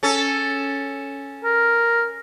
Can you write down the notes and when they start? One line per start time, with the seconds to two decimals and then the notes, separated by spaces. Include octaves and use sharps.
0.03 C#4 A4
1.44 A#4